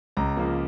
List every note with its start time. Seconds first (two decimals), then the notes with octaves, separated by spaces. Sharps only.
0.17 C#2 A#5
0.37 C#3 F3 A#3